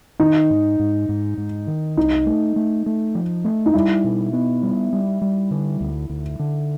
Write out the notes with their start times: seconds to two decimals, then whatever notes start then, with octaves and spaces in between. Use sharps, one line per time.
0.20 D#3 D#4
0.50 G#2
0.79 G#2
1.09 G#2
1.38 G#2
1.67 D#3
1.97 C2 D#4
2.26 A3
2.56 A3
2.86 A3
3.15 F3
3.44 A3
3.66 D#4
3.74 G3 E4
4.04 B2
4.33 B3
4.62 G3
4.93 G3
5.21 G3
5.51 D3
5.81 D2
6.10 D2
6.39 D3